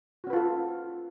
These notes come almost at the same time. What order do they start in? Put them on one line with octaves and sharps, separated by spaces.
F#4 C#4 B4 F4 A4